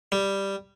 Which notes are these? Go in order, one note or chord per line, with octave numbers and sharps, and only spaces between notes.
G3